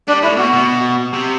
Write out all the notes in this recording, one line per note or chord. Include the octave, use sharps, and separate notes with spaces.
G3 D4
A2 E4
B2 F#4
B2
C3